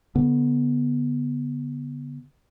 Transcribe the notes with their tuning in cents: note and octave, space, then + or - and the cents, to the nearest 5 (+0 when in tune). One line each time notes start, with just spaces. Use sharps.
D3 -30 B3 -15